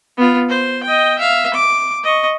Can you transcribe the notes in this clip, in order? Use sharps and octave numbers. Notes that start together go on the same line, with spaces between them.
B3 F4
C5
D#5 G5
E5 F5
D6
D#5 C#6